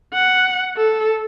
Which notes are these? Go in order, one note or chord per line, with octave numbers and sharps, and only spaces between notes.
F#5
A4